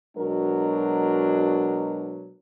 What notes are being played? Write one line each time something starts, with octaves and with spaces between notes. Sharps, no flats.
B2 F#3 G#3 D4 F#4 A#4